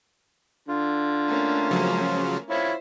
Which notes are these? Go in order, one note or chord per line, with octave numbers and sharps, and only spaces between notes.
D3 F4
A3 A#3 C#4
C#3 F3 F#3
E4 F4 C5 C#5 E5